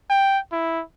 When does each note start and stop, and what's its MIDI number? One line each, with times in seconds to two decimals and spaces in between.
0.10 0.39 79
0.52 0.82 64